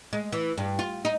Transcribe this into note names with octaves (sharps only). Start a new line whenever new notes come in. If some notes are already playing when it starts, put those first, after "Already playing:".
G#3
E3
G2
F4
D#4